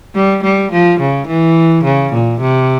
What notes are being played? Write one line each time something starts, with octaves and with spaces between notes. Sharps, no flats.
G3
G3
F3
C#3
E3
C#3
A#2
C3